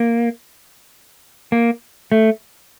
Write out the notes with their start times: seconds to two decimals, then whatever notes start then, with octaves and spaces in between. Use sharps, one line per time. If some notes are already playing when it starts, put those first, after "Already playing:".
Already playing: A#3
1.52 A#3
2.12 A3